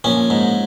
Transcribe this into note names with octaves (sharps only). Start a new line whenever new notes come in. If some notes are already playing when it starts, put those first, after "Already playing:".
A#1 C#4
G#2